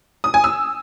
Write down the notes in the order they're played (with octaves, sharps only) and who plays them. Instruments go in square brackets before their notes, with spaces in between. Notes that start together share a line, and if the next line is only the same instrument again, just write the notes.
[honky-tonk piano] D#6
G#5
E6